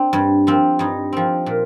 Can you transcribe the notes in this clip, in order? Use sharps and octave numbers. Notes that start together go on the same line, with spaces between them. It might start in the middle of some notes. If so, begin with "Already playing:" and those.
Already playing: C4 D4
G2
F3 C4
G2 D#4
F3 C4
A#2